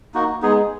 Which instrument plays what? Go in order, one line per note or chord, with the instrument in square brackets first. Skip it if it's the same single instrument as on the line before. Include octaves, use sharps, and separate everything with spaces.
[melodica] A#3 D#4 F#4
[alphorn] G#3 [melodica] B3 D#4 G#4